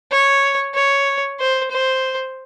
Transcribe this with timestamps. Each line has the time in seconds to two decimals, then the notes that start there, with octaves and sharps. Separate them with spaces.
0.11 C#5
0.74 C#5
1.39 C5
1.71 C5